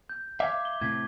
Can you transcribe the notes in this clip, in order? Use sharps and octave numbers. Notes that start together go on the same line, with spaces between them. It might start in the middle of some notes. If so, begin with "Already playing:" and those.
G6
E5 F5 D6 G#6
G7
A2 C3 G#6 B6